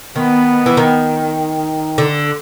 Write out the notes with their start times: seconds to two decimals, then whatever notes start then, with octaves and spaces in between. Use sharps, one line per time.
0.16 D#3 B3
0.66 E3
0.77 D#3
1.98 D3